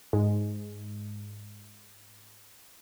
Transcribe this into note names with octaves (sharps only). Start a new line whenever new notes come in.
G#2 G#3